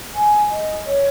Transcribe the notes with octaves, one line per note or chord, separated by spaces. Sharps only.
G#5
D#5
C#5